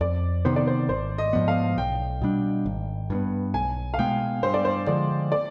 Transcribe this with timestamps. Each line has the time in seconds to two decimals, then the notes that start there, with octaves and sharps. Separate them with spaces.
0.01 F2 D5
0.45 C3 D#3 B3 C5
0.56 D5
0.67 C5
0.89 G#1 C5
1.18 D#5
1.33 G#2 F3 B3
1.48 F5
1.78 B1 G5
2.22 B2 G3 D4
2.66 G#1
3.10 G2 D#3
3.15 B3
3.54 B1 G#5
3.94 F5
3.98 B2 G#3 B3 G5
4.43 G2 C5
4.54 D5
4.65 C5
4.87 D3 F3 G#3 D5
5.32 D5